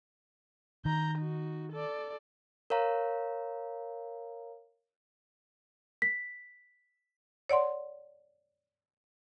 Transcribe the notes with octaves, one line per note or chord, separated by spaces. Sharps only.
D#3 A#5 G6
D#4 F#4
A4 D5
A#4 C#5 F5 A#5
B6
C#5 D5 F#5 C6